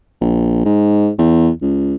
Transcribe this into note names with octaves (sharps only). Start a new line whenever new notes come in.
A#1
G#2
E2
C#2